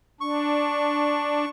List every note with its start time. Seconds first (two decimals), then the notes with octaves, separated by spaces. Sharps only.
0.21 D4 C#6